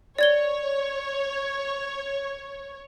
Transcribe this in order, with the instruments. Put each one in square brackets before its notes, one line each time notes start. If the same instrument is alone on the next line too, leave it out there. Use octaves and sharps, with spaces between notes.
[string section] C#5 [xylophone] D5 G#6 G7